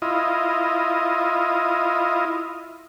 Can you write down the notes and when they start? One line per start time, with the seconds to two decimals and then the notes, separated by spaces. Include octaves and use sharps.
0.02 E4 F4 D#5